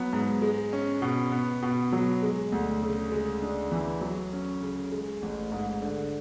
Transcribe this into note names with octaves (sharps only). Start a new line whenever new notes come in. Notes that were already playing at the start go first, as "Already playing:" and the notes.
Already playing: F#3 B3
G#2
G#3
C#4
B2
B3
B2
F#3
G#3
D2
C#3
G#3
D4
E3
F#3
C#4
C#3
G#3
A1
G#2
D3